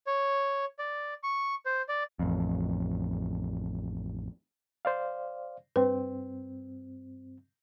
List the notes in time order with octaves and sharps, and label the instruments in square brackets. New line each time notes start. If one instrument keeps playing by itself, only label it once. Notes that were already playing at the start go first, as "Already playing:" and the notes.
[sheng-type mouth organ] C#5
D5
C#6
C5
D5
[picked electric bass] A1 F2
[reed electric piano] C5 D5 F5
[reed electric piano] G2 C4 [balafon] B4